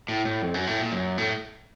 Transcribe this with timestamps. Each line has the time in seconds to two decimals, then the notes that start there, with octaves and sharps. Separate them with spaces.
0.08 A2
0.25 A2
0.42 F2
0.54 F#2
0.67 A2
0.80 A#2
0.92 F#2
1.18 A2